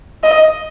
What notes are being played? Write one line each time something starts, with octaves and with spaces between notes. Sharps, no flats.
D#5